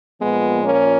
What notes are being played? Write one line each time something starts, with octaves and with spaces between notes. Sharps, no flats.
A#2 F3 G#3 B3
A#3 C#4